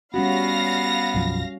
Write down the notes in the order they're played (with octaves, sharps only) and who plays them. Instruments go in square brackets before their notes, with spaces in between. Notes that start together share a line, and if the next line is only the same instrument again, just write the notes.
[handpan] G3 C#4 F#4 [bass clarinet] B3 [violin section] F5 A#6
[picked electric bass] B1 F#2 F3